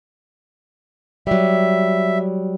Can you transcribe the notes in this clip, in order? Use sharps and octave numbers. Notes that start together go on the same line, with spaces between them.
F#3 G3 E5